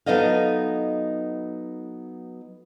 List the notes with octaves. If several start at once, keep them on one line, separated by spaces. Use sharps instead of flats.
F#3 B3 D#4 A4 D#5 F5